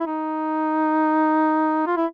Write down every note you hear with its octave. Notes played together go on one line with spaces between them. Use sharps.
E4
D#4
F4
E4